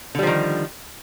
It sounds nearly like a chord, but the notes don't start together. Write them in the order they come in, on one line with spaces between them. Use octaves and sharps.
D3 G3 F3 D#3